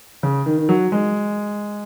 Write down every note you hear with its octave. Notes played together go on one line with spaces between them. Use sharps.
C#3
D#3
D#3
F#3
G#3